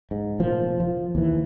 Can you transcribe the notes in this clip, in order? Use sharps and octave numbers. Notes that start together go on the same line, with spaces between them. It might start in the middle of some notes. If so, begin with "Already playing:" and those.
G#2
F1 A#2 F3
F3
D#2 E3